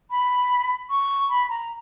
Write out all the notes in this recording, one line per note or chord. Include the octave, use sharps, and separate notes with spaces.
B5
C#6
B5
A#5